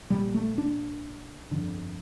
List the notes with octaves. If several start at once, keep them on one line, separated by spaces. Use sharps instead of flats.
A#1 A#2 G3
A3
D4
G1 F2 D3